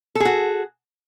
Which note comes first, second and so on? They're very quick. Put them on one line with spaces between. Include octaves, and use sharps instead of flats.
A4 G#4 F#4